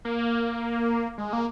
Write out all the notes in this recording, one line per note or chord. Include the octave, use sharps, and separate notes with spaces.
A#3
G#3
A#3